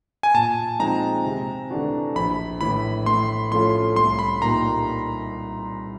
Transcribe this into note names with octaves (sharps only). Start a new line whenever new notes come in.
G#5
A#2 A5
F3 G#3 C4 D#4 A#5
C3
E3 A3 D4 F#4
A#1 B5
A2 E3 B5
A2 C6
F3 A3 C#4 F4 C6
C2 C6
B5
A#2 G3 A#3 D#4 A#5